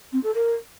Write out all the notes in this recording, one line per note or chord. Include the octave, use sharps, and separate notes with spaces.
C4
A4
A#4